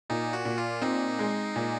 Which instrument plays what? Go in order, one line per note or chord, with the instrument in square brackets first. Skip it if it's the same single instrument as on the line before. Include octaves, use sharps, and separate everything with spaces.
[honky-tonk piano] A#2 [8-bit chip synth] D#4
[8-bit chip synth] F#4
[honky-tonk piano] A#2
[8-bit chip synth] F4
[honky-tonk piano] C4 [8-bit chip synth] D#4
[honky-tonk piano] G#3
A#2